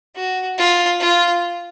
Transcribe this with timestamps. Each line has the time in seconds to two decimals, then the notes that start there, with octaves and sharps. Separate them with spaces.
0.16 F#4
0.58 F4
1.00 F4